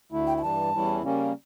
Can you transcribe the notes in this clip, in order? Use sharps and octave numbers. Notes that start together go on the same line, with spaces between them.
D2 D3 A3 E4
G5
G5
G2 E3 G3 A5
E2 E3 G3 C#4 E4
C#3 G3 A#3 C#4